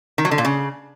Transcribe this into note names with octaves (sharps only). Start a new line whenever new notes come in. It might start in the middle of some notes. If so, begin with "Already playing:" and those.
D#3
F#3
D3
A#2
C#3